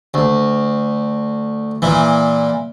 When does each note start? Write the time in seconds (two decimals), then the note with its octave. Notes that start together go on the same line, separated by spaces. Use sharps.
0.14 D2
1.82 A#2 E3